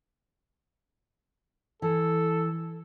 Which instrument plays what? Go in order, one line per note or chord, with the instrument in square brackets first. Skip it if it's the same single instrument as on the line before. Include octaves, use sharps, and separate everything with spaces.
[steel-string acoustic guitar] E3 [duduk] A4